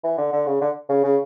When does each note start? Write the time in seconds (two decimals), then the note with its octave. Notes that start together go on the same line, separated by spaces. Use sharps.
0.04 E3
0.18 D3
0.33 D3
0.47 C#3
0.61 D3
0.89 C#3
1.04 C#3